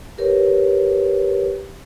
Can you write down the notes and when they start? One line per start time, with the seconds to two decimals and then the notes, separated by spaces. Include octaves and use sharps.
0.18 G4 A#4 B4 C#5